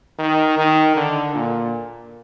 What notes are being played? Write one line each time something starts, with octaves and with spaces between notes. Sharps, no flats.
D#3
D#3
D3
A#2